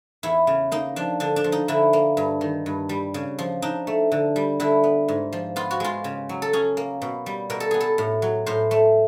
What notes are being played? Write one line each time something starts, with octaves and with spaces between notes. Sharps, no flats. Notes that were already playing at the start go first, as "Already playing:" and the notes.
E2 E4
C#3
A#3 D#4
F3 D4
D3 D4
D4
F3
D#4
D3 E4
A#3
G2
D#3
G2
G3
C#3
F3
D4 D#4
A3
D3
G3
D3 E4
B3
G#2
F3
B3 F4
F#4
G#3 F4
C#3
F#3
A4
C#4 G#4
A#3
B2
G3
B2 A#4
A4
B3 G#4
A4
A2
F#3
A2 C5
A3